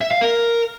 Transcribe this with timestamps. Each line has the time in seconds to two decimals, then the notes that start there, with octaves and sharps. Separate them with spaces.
0.01 E5
0.11 F5
0.21 A#4